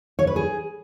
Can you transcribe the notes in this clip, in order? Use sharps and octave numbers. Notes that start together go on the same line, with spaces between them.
C#5
B4
G#4